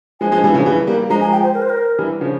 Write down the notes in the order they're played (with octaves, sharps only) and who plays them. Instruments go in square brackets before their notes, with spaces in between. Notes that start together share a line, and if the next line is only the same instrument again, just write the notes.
[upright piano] F3 G#3 [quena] G#5
[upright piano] F3 G#3
E3 G3
C#3 F3
E3 G3
G3 A#3
[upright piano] F3 G#3 [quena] A#5
[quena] G#5
G5
C5
A#4
C5
A#4
[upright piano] E3 G3
C#3 F3